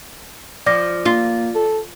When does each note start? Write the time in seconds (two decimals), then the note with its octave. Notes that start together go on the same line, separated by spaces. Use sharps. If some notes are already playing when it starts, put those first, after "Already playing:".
0.66 F3 D5 D6 A#6
1.05 A#3 F4
1.55 A4